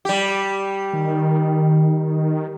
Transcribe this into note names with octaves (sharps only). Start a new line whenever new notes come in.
G3 G4
D#3